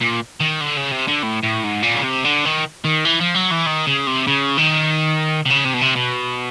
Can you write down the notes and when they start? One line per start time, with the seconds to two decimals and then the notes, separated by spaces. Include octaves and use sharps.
0.01 A#2
0.40 D#3
0.61 D3
0.77 C#3
0.91 C3
1.08 D3
1.23 A2
1.43 A2
1.64 G#2
1.83 A#2
1.95 C#3
2.04 C3
2.24 D3
2.45 D#3
2.85 D#3
3.05 E3
3.21 F3
3.35 F#3
3.52 E3
3.67 D#3
3.87 C#3
4.07 C3
4.27 C#3
4.58 D#3
5.46 C3
5.50 C#3
5.65 C3
5.73 B2
5.81 C3
5.95 B2